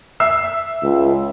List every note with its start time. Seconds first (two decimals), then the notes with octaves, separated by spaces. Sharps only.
0.20 E5 E6 C7
0.83 C#2